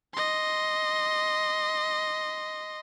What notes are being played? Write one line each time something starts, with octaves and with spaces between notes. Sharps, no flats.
D#5 C6